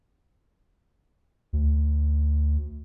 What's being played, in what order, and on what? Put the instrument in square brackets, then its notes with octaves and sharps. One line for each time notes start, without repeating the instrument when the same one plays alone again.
[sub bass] D2